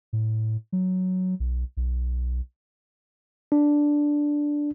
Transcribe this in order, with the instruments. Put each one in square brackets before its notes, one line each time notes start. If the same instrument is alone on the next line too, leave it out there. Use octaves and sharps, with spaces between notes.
[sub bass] A2
F#3
B1
B1
[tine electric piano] D4